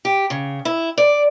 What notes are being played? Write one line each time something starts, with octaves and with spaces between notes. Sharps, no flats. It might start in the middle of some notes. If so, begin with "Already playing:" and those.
G4
C#3
E4
D5